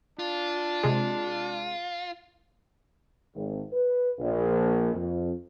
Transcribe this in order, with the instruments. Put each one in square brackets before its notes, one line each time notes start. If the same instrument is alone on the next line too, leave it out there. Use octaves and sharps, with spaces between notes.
[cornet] D4 [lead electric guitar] F4
[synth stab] C3 G#3
[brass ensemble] G#1
B4
A#1
F2